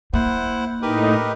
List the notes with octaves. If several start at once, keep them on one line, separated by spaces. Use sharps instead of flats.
A#3 E4 C5 F#5
A2 D#4 G4 A#4 B4